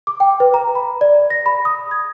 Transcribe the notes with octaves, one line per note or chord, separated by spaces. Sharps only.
D6
G5
B4
A#5
B5
D5
A#6
B5
D#6
G#6